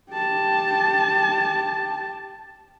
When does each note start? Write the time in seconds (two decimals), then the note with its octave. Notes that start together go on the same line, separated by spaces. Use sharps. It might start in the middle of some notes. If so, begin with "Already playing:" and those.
0.13 G4 A5